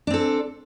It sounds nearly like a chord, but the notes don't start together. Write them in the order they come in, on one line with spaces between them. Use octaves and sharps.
D4 C4 A4